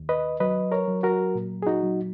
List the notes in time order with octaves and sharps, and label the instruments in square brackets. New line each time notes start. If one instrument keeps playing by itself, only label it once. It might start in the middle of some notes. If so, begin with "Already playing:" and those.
Already playing: [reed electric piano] D#2
B4 D#5
F#3 B4 D#5
A#4 C#5
F#3
F#4 A#4
A#2
G#4
D#4 F#4
F#3